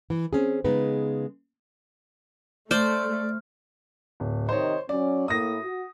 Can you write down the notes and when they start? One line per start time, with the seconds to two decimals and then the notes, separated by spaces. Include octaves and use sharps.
0.10 E3
0.33 C4 C#4 G#4
0.64 C#3 G#3 B3 D#4 B4
2.71 A3 C5 D5 F6
4.20 D1
4.49 C3 D#3 C5 C#5 D#5
4.89 F#3 C#4 D5
5.28 A2 A#3 D#6 A#6
5.62 F#4